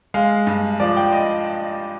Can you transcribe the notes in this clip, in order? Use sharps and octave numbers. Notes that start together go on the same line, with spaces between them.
G#3 F5
G2
F3 D5
G5
D#5